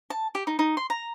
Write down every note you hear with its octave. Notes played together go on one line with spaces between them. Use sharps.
A5
G4
D#4
D#4
C6
A#5